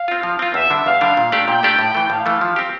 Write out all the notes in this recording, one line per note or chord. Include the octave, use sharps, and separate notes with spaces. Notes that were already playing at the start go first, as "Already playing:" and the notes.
Already playing: F5
C4 F4
F3
C4 F4
E2 E5
D3 G3 D4
E2 F5
D3 G3 D4
A#2
A3 D4 G4 D5
A#2 G5
A3 D4 G4 D5
A2
E3 A3
A2 F5
E3 A3
F3
C4 G4